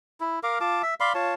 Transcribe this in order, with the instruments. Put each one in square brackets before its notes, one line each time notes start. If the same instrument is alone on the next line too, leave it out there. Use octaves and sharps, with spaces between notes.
[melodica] E4
A#4 F5 D6
F4 A5 D6
E5
D5 F5 B5 C6
F4 C#5 A5